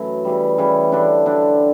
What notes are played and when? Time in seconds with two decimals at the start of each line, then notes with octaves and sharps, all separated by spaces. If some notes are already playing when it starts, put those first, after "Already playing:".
Already playing: F#2 E3 A3 E4
0.25 C#3 E3 G3
0.58 C#3 E3 G3
0.92 D3 G3 D4
1.26 D3 G3 D4